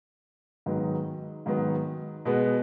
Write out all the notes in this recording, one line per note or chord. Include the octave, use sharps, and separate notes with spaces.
G#2 D#3 F#3 B3
G#2 D#3 F#3 B3
B2 G#3 B3